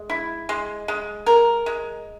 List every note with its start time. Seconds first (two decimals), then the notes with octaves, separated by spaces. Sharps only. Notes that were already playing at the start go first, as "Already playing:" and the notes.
Already playing: G#3
0.10 E4
0.49 G#3
0.88 G#3
1.26 A#4
1.66 G#3